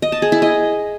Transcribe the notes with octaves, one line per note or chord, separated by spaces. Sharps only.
D#5
A5
G#4
E4
D#5